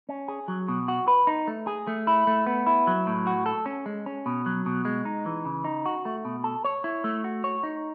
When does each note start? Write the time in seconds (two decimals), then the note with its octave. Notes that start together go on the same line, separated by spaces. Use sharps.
0.09 C#4
0.28 G#4
0.48 F#3
0.68 B2
0.88 F#4
1.08 B4
1.27 D#4
1.48 A3
1.67 G#4
1.87 A3
2.07 E4
2.27 A3
2.46 B3
2.67 E4
2.87 F#3
3.07 A2
3.27 F#4
3.46 A4
3.66 C#4
3.86 G#3
4.06 C#4
4.26 B2
4.46 F#3
4.66 B2
4.85 G#3
5.05 D#4
5.26 E3
5.45 C#3
5.64 D#4
5.86 F#4
6.05 A3
6.25 B2
6.44 A4
6.65 C#5
6.84 E4
7.04 A3
7.24 F#4
7.44 C#5
7.63 D#4